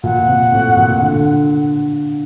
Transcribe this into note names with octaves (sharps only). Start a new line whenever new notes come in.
A#2 F#5
C3
A2
A#2
D3